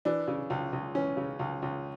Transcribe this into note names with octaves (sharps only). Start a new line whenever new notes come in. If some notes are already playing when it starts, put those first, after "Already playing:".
E3 D4
C#3
C#2
C#2
E3 C#4
C#3
C#2
C#2